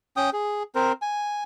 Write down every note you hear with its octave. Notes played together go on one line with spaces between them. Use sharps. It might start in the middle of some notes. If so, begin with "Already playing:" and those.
C#4 G5 D#6
G#4
C4 A#4 C5
G#5